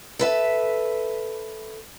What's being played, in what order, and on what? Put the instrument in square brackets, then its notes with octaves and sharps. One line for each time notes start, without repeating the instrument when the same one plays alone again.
[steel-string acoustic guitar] A4 B4 E5